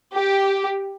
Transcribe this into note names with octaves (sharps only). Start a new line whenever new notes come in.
G4